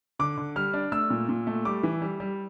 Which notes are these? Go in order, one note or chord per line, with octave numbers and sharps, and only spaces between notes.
D3 D6
D3
G3 F6
D4
A3 E6
A#2
A#2
A3
G3 D6
E3
G3
G3